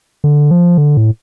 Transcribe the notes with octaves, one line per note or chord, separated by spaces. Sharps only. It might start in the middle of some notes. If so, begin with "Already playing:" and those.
D3
F3
D3
A2